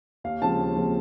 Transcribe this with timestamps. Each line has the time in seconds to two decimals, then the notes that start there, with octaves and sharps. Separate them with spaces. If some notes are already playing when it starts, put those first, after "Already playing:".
0.24 D#2 F5
0.42 C#3 F3 G#3 C4 A5
0.59 D#2
0.76 C#3 F3 G#3 C4